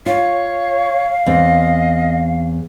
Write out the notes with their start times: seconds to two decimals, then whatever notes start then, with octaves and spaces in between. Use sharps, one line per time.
0.06 F4 C#5 F5
1.26 E2 C4 D#5